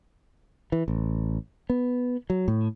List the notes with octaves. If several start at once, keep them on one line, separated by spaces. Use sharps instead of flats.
E3
A1
B3
F#3
A2